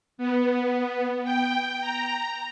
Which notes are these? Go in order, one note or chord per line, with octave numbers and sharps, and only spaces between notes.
B3
G5
A#5